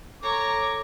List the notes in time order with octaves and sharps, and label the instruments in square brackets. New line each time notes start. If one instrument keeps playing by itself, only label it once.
[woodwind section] A4 D6 [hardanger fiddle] C#5 A#5